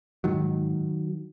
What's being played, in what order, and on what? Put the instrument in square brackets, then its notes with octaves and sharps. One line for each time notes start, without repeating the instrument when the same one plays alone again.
[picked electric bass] G#2 D#3 F#3